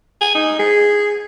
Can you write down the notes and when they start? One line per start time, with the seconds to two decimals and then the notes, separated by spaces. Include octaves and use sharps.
0.21 G#5
0.35 D#4
0.59 G#4